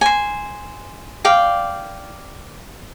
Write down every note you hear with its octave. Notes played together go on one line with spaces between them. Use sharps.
C5 G#5
D5 F5 G5